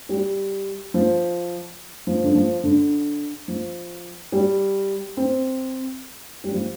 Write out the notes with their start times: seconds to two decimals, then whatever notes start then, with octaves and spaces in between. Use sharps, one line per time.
0.09 G3
0.94 F3
2.07 F3
2.24 D3
2.35 F3
2.64 D3
3.48 F3
4.32 G3
5.17 C4
6.44 G3
6.53 F3